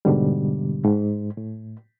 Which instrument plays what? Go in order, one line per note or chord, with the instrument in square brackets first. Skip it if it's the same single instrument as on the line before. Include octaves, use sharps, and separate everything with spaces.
[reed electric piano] G#2 B2 D3 G3
G#2
A2